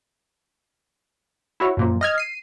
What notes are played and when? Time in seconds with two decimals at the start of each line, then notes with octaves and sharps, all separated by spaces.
1.60 E4 F#4 C#5
1.77 F#2 A#2 F3
2.01 D#5 F6 G#6
2.18 C7 D#7